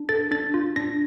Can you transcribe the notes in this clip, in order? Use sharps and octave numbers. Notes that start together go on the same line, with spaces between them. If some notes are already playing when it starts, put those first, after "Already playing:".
Already playing: D4
A4 A6
D4 A6
F4
D4 A#6